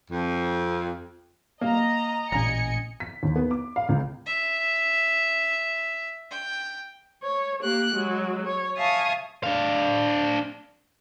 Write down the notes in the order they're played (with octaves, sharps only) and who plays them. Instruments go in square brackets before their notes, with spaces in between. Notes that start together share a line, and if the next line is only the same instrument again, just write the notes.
[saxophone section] F2
[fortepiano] A#3 [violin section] D#5 A#5
[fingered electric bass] A1 A#2 C#4 [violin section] D#5 G#5 C#7 [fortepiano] A#5
[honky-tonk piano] B6
D#2
B3
D6
F5
C#2
[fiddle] E5
G5
[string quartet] C#5
A#3 G4 F#6
F#3 G#3
C#5
E5 F5 G#5 A5 C#6 D#6
[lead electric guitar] D4 F5